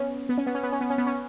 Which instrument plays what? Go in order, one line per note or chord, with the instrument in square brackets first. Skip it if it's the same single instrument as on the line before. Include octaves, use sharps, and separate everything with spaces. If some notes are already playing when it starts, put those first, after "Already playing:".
Already playing: [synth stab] B3 C#4
B3
C#4
B3
C#4
B3
C#4
B3
C#4
B3
C#4